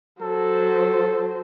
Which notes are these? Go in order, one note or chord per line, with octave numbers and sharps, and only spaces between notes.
F#3 A4 C5